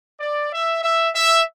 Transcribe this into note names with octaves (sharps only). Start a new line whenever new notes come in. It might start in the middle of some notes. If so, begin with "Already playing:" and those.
D5
E5
E5
E5